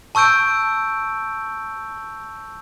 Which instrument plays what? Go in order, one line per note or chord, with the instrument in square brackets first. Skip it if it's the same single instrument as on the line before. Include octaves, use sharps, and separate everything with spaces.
[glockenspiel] A5 C#6 E6 G6 D7